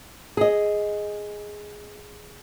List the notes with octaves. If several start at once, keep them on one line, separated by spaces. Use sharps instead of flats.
G#4 D#5